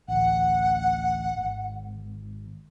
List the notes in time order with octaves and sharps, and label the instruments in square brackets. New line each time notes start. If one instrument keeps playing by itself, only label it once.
[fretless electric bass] A1 D2 [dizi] F#5
[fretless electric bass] G#1